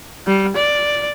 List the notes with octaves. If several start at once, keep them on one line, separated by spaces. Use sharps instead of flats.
G3
D5